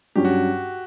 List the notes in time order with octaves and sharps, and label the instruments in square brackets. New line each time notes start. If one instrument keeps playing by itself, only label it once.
[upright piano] G2 F#3 C#4 [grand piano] G4
[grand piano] F#4